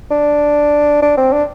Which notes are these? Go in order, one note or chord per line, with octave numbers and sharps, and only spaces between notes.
D4
D4
C4
D4